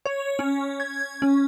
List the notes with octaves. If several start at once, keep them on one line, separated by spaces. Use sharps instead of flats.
C#5
C#4
G#6
C#4